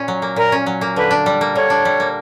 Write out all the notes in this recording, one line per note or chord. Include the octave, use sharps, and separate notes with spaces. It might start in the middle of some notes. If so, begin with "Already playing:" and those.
Already playing: A#2 C#4
F#3
A#3
A#2 A#4
C#4
F#3
A#3
D3 B4
D4
G3
A#3
D3 C#5
D4
G3
A#3